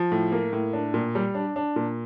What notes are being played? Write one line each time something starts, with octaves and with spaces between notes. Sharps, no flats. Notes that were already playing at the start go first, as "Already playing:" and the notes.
Already playing: F3
A2
A#3
A2
D4
A#2
G3
D4
D4
A#2